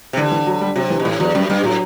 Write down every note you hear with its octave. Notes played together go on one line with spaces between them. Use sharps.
C3
D3 E3
E3
F#3
G3
C3 F#3
E3
B2
A2 E3
E2 F#3
F#2 G3
G2 G3
A2 F#3